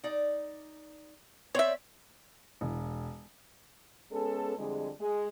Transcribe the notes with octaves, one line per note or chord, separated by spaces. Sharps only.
D#4 D5
C4 C#5 D5 E5 G5
E1
G#3 B3 C#4 G#4 A4
F2 D3 G3 G#3
G#3